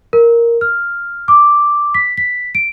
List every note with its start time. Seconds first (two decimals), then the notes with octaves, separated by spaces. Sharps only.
0.13 A#4
0.61 F6
1.28 D6
1.94 B6
2.17 B6
2.55 D7